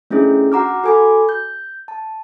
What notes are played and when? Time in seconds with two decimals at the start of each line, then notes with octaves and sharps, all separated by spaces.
0.10 A3 C#4 D4 E4 G#4
0.52 F#4 F#5 A#5 D6 F6
0.84 F#4 A4 G#5 B5 D6
1.29 G6
1.88 A5